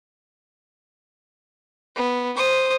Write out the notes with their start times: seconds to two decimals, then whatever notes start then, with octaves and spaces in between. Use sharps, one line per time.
1.96 B3
2.37 C5 D#6